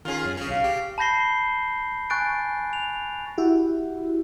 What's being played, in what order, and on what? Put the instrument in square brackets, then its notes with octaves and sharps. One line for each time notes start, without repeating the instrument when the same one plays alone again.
[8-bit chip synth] D#3 C#4 [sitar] F4 G#4
[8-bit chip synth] F#2
[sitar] C#3 [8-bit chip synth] C#4 G#4
[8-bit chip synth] B1 [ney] F5
[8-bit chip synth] G4
[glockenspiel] A5 B5 G6 A#6 C7 G7
G#5 C#6 F#6 G6 A6 D7
F7
[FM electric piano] E4 F#4 G4